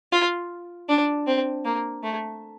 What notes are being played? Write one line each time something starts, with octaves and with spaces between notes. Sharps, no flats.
F4
D4
C4
A#3
A3